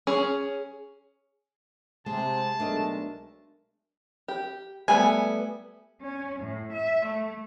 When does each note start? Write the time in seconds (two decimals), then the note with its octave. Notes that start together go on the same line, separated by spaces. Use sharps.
0.07 C#4 G#4
2.06 C3 G#3 A5
2.60 B1 G#3 A3 D4 A#4 D#5
4.28 G4
4.88 G3 A3 B3 G#5
6.02 C#4
6.39 A2
6.73 E5
7.06 A3